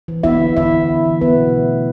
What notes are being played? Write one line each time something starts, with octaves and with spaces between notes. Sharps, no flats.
E3
B3 E4 E5
D3
B3 E4 E5
E3
B3
E3
B3 B4
B2
A3
B2